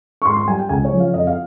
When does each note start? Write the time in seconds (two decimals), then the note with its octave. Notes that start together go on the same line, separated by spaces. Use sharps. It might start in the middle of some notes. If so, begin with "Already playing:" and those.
0.22 C#6
0.25 G#2 C6
0.37 C6
0.48 G3 G#5
0.59 G5
0.69 C#2 G#5
0.85 C#5
0.92 C#3 F3
1.00 F5
1.14 F2 D#5
1.27 F5